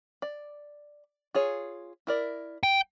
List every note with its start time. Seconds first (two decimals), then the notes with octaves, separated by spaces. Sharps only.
0.22 D5
1.34 F4 G#4 C#5
2.07 E4 A#4 D5
2.63 G5